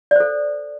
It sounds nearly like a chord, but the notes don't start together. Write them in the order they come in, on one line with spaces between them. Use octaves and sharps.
D5 C5 A4